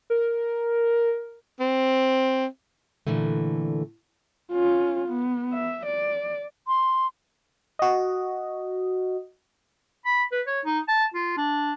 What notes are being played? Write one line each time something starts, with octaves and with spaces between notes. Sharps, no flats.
A#4
C4
A#2 D3 E3 A3
C#4 F4
B3
E5
D5
C6
F#4 D#5
B5
B4
C#5
D#4
A5
F4
D4